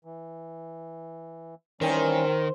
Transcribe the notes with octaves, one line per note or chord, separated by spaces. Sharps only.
E3
D#3 E3 G3 C4 C#4 A#4